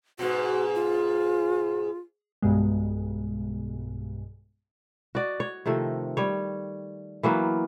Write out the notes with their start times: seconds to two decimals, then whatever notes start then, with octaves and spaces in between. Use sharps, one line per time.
0.19 G#2 B2 F#4
0.74 F4
2.42 B1 G2 B2 G#3
5.15 F#4 D5 D#5
5.40 C#5
5.66 C3 D#3 F3 A3
6.17 G3 C#5
7.23 E3 F#3 A#3 B3